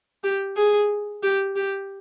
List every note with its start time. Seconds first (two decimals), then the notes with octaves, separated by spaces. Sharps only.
0.23 G4
0.56 G#4
1.23 G4
1.56 G4